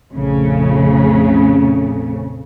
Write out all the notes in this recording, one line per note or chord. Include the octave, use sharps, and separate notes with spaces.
A#1 F2 C#3 A3